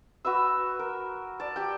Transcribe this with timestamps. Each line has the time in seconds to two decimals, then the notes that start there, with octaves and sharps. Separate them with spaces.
0.25 F#4 B4 E5 E6
0.79 A#4
1.40 D5 A5
1.56 G4 G5